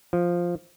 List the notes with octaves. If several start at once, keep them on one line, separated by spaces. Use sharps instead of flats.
F3